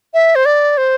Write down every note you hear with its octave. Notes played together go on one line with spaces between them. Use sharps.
E5
C5
D5
C5